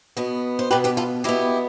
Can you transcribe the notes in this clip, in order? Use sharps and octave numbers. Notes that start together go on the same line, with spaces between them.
B2 B3
C5
B2 B3 G4 B4
G4 B4
F4 A4
B2 B3 E4 G4